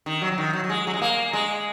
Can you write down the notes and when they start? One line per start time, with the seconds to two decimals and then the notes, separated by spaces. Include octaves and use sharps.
0.06 D#3
0.22 F#3
0.32 F#3
0.38 D#3
0.53 F#3
0.64 F#3
0.69 G#3
0.87 F#3
0.94 G#3
1.02 A#3
1.33 G#3